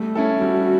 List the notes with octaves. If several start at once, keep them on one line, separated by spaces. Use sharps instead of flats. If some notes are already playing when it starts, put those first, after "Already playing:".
Already playing: G3 A3
C#4 E4 A4
G3 F#4